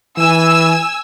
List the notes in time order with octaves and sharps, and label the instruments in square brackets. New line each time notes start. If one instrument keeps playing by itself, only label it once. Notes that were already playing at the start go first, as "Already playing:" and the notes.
[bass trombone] E3 [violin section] G#5 E6